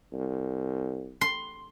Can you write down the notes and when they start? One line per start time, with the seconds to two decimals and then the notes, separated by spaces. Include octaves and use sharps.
0.13 C2
1.21 C6